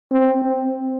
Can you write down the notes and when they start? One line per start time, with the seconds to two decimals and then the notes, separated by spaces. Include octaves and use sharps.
0.11 C4
0.42 C4